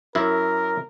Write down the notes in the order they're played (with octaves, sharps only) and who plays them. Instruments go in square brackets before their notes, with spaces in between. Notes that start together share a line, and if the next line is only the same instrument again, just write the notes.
[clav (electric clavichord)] F#2 E4 [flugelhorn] A#4